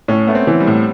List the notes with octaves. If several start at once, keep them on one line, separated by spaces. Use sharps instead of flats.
A2 C#4
A3 B3
C4
E3
G3
A2